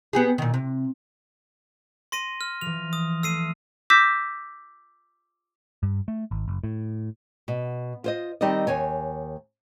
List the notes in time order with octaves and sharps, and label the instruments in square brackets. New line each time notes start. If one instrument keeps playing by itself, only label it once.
[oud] B3 G4 G#4
A#2 D#3
C3
[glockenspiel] C6 A#6 D#7
F6
[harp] E3 F3 [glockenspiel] F7
[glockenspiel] D#6
[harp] A3 [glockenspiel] E6 C7 D#7
[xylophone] D6 E6 G6 A#6 B6 E7
[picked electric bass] G2
A3
G#1
F#1
A2
[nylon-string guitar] B2
F4 C5 D#5
D#3 G3 C4 D#4 D5 D#5
D#2 C#5 G#5